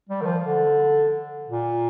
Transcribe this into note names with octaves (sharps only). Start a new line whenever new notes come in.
G3
D#3
F3
D3
A#2